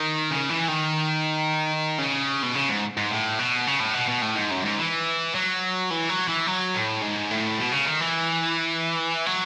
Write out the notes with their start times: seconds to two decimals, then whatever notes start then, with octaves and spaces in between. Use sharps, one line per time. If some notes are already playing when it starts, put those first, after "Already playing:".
Already playing: D#3
0.31 C#3
0.49 E3
0.68 D#3
1.98 C#3
2.43 B2
2.55 C#3
2.69 G#2
2.97 G#2
3.11 A2
3.39 B2
3.67 C#3
3.80 A2
3.94 B2
4.08 B2
4.22 A2
4.36 G#2
4.51 F#2
4.65 G#2
4.79 E3
5.35 F#3
5.91 E3
6.09 F#3
6.28 E3
6.47 F#3
6.74 A2
7.01 G#2
7.31 A2
7.59 B2
7.72 C#3
7.86 D#3
8.00 E3
9.26 F#3